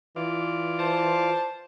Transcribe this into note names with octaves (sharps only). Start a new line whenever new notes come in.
E3 F4 D5
C5 A5